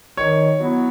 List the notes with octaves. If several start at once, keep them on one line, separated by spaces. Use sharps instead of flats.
D#3 C#5
F#3 B3 E4